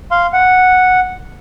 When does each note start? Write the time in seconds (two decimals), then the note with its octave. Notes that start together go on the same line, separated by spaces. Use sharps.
0.11 F5 C6
0.33 F#5